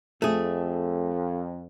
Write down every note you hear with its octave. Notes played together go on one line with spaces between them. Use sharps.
F2 A3 G#4